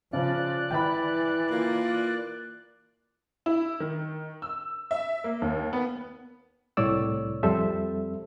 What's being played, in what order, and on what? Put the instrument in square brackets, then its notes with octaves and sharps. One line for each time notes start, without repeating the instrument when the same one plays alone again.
[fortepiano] C#3 [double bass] F3 [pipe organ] D5 F#6
[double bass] E3 [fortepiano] G5 B5
[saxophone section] A#3 F4
[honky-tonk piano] E4
D#3
E6
E5
A#3
D#2
B3
[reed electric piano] C2 A2 C#5 D5 E6
F2 G3 C4 A4 C5 E5